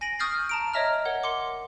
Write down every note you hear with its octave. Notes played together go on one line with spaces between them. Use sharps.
G#5 A#6 D7 D#7 F#7
C#6 D#6 F6 G6 A6 C7
A5 A#5 D7
C#5 D#5 E5 A#5 F6
A#4 C#5 F#5
F#5 C6 D6